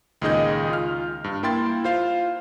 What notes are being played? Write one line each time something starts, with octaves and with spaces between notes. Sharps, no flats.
C#2 A#2 D#3 G#4 D#5 G6
F4 F6
G2
A#3 E4 G5 C6 A6
F4 C5 F5